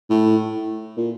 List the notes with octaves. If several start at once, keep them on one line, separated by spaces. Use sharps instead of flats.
A2
A#2